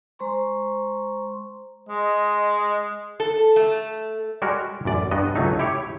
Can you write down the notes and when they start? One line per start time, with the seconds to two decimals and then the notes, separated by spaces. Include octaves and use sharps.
0.19 G#3 C5 A#5 C6 C#6
1.89 G#3 D#5
3.20 A4
3.56 A3
4.42 G3 G#3 F#4 A#4
4.85 A1 F#2 D5
5.11 G2 B3 D#5
5.35 C#2 F#3 A3 D#4
5.59 E4 G4 C#5